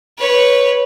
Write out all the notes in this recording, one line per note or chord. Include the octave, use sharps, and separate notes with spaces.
B4 C#5